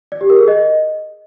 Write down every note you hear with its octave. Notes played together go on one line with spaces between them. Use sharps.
D5
G4
A#4
G#4
D#5